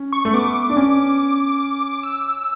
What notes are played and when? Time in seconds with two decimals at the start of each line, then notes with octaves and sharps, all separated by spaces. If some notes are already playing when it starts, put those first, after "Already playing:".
Already playing: C#4
0.13 C#6
0.25 A3
0.33 B3 D6
0.70 D4
0.77 C#4
2.03 E6